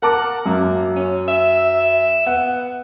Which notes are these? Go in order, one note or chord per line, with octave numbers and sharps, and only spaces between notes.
A#4 F#5 A5 D6
F#2 A#3
C#4
E5
B3 F#5